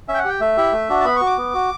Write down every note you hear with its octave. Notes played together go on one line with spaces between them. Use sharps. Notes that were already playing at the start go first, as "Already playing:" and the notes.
C#4 E5
G5
F#5
G4 G5
A3 E5
E4 G4
A3
D4 F#4
A5
B3 B5
F#4 C#6
D6
B3
F#4